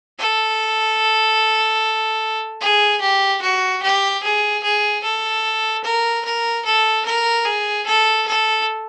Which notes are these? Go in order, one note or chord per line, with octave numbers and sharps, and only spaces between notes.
A4
G#4
G4
F#4
G4
G#4
G#4
A4
A#4
A#4
A4
A#4
G#4
A4
A4